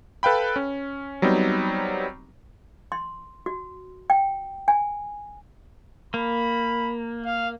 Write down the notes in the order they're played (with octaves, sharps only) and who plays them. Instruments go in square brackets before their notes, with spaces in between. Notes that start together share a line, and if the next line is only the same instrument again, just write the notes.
[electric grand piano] A4 B4 F5 G5 B5
C#4
F#3 G3 B3 C4 D#4
[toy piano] C6
F#4
G5
G#5
[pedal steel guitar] A#3 [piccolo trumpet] B5
[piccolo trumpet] F5